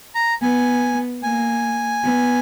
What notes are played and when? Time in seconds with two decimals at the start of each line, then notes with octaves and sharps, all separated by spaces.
0.15 A#5
0.42 B3 G#5
1.23 A#3 G#5
2.03 B3